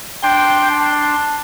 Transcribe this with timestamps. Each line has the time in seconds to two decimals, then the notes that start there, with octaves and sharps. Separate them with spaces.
0.23 D4 G5 C6
0.71 A5